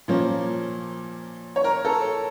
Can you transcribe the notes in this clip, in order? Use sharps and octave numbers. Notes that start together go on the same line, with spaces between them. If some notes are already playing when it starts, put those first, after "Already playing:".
A#2 F3 A#3 C#4
C#5
A#4
A4